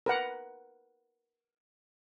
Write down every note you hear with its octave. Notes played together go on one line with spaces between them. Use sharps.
A#4 B4 F#5